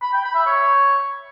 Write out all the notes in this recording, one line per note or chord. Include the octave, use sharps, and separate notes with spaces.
B5
G5
B5
E5
C#5